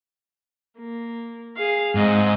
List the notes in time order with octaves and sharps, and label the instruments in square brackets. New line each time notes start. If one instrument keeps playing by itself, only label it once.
[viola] A#3
G#4 F5
[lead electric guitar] G#2 [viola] C4 D#5